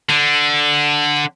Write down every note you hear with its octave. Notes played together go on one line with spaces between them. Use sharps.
D3